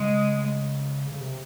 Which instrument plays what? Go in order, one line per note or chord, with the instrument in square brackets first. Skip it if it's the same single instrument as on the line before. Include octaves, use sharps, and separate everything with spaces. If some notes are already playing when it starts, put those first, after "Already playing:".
Already playing: [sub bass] C#3 [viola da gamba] G#3
[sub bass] C#3
C3